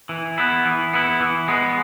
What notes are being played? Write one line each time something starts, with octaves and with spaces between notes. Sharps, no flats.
E3
B3 E4
E3
B3 E4
E3
G#3 B3